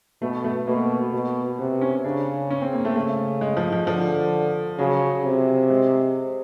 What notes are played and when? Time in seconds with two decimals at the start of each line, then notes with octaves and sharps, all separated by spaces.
0.22 B2 A3
0.44 A3
0.67 B2 A#3
1.13 B2
1.58 C3 B3
1.81 C#4
2.04 C#3 D4
2.50 C#4
2.61 C4
2.73 A#3
2.85 A3
2.96 C#3 A3
3.41 G#3
3.57 F3
3.72 F3
3.87 D3 F3
4.78 C#3 F#3
5.25 C3
5.70 G#3